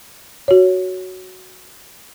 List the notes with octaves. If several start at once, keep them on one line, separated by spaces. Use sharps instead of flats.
F#4 C#5